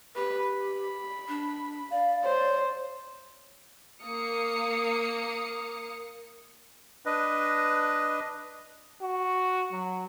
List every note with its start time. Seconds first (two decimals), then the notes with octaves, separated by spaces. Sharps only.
0.16 G4 B4
0.52 B5
1.29 D4
1.91 D5 F5
2.24 C5 C#5
4.02 A#3 F5 D#6 C#7
7.06 D4 B4 D#5
9.02 F#4
9.72 F#3